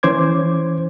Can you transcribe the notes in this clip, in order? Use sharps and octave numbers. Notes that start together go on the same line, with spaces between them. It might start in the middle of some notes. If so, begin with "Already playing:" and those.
E3 C#4 C5 D6 G#6